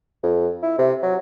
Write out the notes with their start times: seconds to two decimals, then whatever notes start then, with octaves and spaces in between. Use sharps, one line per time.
0.23 F2
0.63 E4
0.79 C3
1.02 F#3